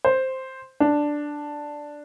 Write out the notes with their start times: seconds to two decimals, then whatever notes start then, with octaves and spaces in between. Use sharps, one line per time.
0.05 C5
0.80 D4